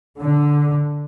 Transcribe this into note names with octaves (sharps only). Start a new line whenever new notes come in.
D3